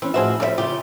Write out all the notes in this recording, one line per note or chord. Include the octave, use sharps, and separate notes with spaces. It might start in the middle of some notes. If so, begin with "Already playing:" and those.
E3 C4 C#4
A2 F3 F#4 G#4 C5 E5
F3 G3 C5 E5
C#3 F4 G4